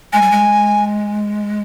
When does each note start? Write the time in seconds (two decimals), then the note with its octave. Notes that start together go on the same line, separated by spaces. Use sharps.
0.13 G#3 G#5
0.22 G3
0.31 G#3